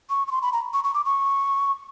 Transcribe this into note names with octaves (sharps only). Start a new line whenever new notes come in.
C#6
C#6
C6
B5
A#5
C#6
C#6
D6
C#6